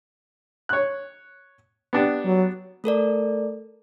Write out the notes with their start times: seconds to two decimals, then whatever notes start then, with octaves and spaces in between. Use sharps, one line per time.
0.69 C#5 F#6
1.93 B3 D4 G4
2.25 F#3
2.84 A3 A4 A#4 D5